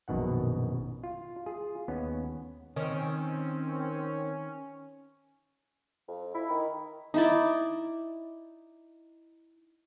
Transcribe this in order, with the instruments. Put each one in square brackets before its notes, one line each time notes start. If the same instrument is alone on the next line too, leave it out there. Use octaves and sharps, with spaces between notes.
[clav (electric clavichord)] A#1 F#2 B2 D#3 F#5
F4
F4 G#4
D#2 B3 C#4
[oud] D#3 [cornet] C4 [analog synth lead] C#4
[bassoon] F2
E4
D#3
[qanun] D#4 E4 D5